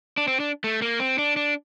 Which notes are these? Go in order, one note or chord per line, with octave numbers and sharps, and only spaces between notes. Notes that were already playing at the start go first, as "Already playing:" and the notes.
D4
C4
D4
A3
A#3
C4
D4
D4